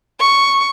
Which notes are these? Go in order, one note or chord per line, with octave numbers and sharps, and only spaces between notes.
C#6